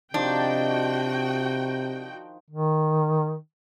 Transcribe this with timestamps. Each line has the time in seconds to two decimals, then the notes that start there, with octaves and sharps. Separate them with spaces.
0.14 C3 D#3 F3 D4 D#4 F#4 G5
2.51 D#3